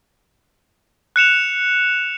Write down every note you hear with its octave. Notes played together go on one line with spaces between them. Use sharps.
F#6 C#7 E7 F7